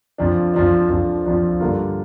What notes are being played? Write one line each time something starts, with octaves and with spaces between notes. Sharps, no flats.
F2 F3 D4
F2 F3 D4
F2 F3 D4
F2 F3 D4
G2 D3 A#3 F4